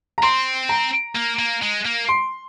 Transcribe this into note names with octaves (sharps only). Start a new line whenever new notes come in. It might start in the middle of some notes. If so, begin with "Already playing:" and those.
A#5
C4 C6
A#5
A#3
A#3
G#3
A#3
C6